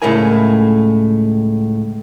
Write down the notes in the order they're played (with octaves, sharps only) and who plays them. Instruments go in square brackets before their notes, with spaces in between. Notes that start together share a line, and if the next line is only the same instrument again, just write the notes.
[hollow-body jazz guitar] C#2 A2 A3 E4 A#4 G#5